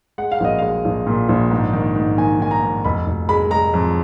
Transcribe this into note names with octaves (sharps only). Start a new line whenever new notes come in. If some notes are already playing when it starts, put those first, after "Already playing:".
G#3 F#5
F5
A#1 D#5
G#3 F5
A#1
A#2
A#1
G#2
D#3
G#2
D#3 G#5
D#3 G#5
A#5
G#2
F1 B5
F1
G#3 B5
G#3 A#5
F2